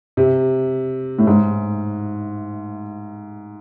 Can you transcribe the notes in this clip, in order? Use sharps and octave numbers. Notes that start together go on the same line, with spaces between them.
C3
A2
G#2